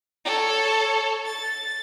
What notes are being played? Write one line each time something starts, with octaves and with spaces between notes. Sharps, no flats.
A4 C#5
A6